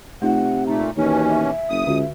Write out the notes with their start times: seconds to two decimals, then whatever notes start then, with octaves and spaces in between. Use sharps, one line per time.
0.22 C3 A3 D#4 F4 F#5
0.67 A#2 A3 D#4 A#5
0.97 D#2 B2 E3 C#4 C#5
1.29 E5 G#5
1.70 F#1 D#6
1.87 C#2 D3 F#4